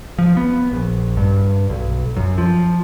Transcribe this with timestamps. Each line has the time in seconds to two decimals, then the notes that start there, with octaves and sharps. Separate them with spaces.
0.19 F3
0.37 B3
0.72 A#1
1.17 G2
1.70 B1
2.17 F#2
2.38 F3